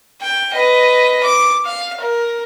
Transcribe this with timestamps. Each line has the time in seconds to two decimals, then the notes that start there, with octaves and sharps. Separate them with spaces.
0.21 G5
0.53 B4 D#5
1.23 D6
1.65 F5
2.00 A#4